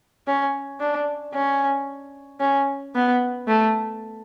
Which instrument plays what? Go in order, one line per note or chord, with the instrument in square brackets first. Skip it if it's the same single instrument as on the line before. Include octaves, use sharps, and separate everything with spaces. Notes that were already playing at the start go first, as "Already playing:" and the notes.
[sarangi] C#4
D4
C#4
C#4
B3
A3